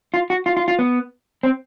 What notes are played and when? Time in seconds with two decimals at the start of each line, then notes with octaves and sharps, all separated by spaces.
0.14 F4
0.30 F#4
0.46 F4
0.57 F4
0.68 F4
0.79 B3
1.43 C4